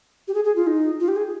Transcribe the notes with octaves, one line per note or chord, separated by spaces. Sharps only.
G4
G#4
G#4
F4
D#4
F4
G4
G#4